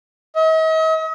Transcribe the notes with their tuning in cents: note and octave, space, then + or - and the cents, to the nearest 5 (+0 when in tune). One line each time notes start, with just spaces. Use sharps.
D#5 +45